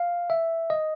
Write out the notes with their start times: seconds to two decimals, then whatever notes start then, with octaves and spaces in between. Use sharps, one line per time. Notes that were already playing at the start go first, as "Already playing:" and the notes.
Already playing: F5
0.30 E5
0.70 D#5